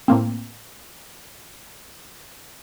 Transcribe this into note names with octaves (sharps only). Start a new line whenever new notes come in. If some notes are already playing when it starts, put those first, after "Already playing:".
A2 A#3 C4